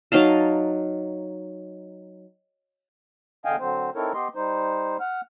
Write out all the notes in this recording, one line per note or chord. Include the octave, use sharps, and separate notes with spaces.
F#3 D#4 F5 A5
E2 D3 D#5 F5 G5 G#5
D3 F#3 C4 C5
C4 D#4 E4 A4 A#4 C#5
B3 G4 D#5 C6
G3 D#4 C5
F#5 F6